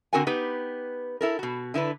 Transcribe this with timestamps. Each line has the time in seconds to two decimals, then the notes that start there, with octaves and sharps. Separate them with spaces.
0.13 D3 C4 F#4 A#4 F#5 G#5
0.27 B3 D#4 G4 B4
1.21 E4 A4 A#4
1.39 B2 F#4
1.74 D3 E4 A4 B4